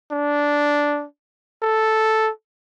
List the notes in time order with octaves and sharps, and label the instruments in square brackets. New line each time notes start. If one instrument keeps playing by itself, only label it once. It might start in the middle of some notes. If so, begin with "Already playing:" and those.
[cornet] D4
A4